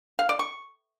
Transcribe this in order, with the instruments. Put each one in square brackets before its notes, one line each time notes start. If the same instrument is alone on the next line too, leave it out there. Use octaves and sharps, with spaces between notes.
[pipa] F5
D5
C#6